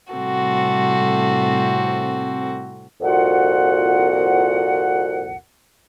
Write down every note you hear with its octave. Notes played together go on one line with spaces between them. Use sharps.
A2 C3 G3 C4 F#4 A4
C2 F2 A#2 F4 F#4 F#5